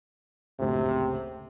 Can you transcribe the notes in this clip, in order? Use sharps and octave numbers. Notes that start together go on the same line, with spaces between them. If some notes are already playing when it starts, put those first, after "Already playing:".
F#1 D2 A2 C3